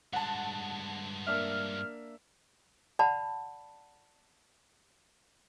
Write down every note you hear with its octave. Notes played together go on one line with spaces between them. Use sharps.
G2 G#3 F#5 A5
A#3 D4 E5 F6
D5 F#5 A5 B5